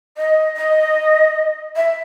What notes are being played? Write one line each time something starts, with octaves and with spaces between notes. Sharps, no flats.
D#5
D#5
E5